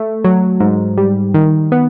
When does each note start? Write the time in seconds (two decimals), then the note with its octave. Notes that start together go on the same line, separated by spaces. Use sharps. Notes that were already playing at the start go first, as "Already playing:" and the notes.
Already playing: A3
0.24 F#3
0.60 G#2
0.98 G3
1.34 D#3
1.72 B3